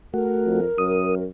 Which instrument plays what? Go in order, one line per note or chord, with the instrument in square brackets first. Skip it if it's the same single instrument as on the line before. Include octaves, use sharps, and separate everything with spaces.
[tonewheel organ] A3 F#4 [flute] A#4
[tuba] F2
[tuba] F#2 [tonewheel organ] D#6